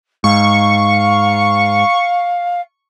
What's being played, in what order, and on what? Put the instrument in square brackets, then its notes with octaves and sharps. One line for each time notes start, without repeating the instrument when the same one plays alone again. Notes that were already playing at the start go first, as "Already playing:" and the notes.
[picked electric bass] G#2 [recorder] F5 [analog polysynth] C#6